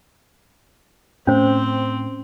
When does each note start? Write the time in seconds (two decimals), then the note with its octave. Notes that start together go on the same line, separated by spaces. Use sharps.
1.27 A2 C4 C#4 C5